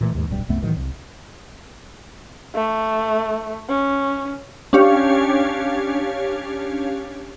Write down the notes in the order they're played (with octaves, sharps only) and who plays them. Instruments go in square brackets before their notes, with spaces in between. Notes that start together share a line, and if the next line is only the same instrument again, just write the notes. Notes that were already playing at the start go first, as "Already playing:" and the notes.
[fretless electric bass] A#2 E3 F3 A3
D#2 G#2
D1 B1 G2 G3
C2 F#2 A3 B3
A2 D#3 E3 F#3
C2
[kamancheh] A3
C#4
[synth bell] C#4 D4 G4 C#5 F5